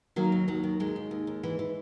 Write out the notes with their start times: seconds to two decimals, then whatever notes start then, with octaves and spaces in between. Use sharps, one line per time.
0.16 D#3 F#3 A#3
0.32 D#2
0.48 D#2 F#3
0.63 D#3
0.80 D#2 G#3
0.96 D#2
1.11 D#2
1.27 D#2
1.43 E3
1.59 E3